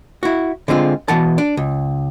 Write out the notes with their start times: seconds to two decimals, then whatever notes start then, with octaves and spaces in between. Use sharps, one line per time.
0.23 E4 F#4
0.68 D3 G#3 C4 F4
1.08 B2 E3 F#5 A5
1.38 D4
1.57 C#2